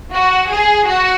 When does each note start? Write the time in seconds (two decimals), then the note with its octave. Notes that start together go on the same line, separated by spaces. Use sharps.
0.12 F#4
0.51 G#4
0.88 F#4